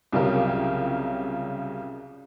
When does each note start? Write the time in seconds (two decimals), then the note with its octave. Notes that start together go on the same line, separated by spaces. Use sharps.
0.13 C2 C#3 F#3 F4 G4 A#4